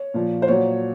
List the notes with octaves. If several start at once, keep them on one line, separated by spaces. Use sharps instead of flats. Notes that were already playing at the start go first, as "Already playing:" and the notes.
Already playing: C#5
A#2 F3
C5
A#2 F#3 C#5